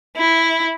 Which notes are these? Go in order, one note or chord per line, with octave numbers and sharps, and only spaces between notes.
E4